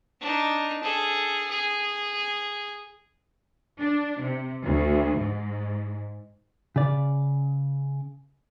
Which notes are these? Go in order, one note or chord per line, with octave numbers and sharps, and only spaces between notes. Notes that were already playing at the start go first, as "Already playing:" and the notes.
D4 D#4
G#4 A4
G#4
D4
C3
D2
G#2
C#3 D5